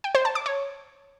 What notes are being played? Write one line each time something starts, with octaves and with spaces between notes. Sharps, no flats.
G5
C5
A5
D6
C#5